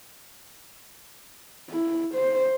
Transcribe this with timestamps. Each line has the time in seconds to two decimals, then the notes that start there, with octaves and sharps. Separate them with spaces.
1.70 E4
2.15 C5